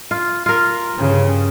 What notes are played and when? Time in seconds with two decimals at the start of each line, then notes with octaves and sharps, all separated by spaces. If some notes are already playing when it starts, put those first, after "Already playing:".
0.11 F4
0.46 F4 A#4
0.94 G2 C#3